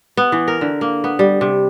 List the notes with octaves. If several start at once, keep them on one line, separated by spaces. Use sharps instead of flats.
B3
E3
A#4
D3
A#3
B3
G3
C3